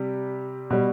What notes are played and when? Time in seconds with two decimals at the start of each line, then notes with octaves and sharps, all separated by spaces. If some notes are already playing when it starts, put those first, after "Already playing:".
Already playing: C3 G3
0.70 B2 G3